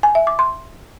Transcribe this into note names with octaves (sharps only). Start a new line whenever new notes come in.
G#5
E5
D6
C6